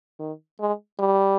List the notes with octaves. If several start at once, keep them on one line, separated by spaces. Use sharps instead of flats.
D#3
G#3
G3